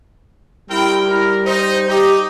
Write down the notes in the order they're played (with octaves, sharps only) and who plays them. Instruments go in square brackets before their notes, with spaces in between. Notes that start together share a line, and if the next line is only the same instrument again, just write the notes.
[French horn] G3 [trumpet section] C4 A#4 G5 [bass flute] E4
[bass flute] E4 [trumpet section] A#4
[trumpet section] D#4 [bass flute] C5
[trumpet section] D#4 [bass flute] G4